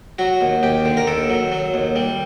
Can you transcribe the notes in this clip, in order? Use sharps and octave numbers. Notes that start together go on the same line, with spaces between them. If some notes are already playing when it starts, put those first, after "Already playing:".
F#3 F#4
D#2
D#2 G4
D3
A#4
D#2 A4
F#3
F#3
D#2
G3